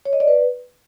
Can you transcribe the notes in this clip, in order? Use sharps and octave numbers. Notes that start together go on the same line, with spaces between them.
C#5
D#5
D5
B4